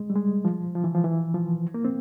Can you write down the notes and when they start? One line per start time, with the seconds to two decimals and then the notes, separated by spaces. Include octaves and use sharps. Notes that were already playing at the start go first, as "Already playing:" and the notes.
Already playing: G#3
0.10 G3
0.15 G#3
0.45 F3
0.75 F3
0.84 E3
0.95 F3
1.04 E3
1.34 F3
1.74 A#3
1.85 C4